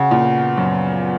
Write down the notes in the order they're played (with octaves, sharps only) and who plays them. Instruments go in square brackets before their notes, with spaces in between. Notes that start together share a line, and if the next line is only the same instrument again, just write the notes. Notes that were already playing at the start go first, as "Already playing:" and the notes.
Already playing: [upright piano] C#3 [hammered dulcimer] F#4
[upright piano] A#2
[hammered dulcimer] B3
[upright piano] F#2 [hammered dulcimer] F3
[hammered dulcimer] B3